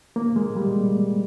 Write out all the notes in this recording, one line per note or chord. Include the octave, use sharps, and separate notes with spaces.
A#3
G#3
G3